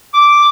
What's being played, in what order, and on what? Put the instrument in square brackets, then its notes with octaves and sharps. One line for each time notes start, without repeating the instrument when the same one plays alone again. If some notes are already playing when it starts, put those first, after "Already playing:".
[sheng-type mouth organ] D6